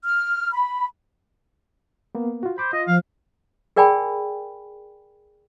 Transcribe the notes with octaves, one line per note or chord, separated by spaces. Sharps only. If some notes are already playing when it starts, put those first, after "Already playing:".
F6
B5
A#3 B3
F4 F#4
C5 B5 D6
F4 D#5
F3 F5
G#4 A#4 D5 G5 G#5 B5